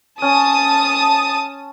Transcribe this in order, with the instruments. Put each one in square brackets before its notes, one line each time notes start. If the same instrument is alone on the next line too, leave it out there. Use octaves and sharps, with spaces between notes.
[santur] C#4 [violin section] A5 D#6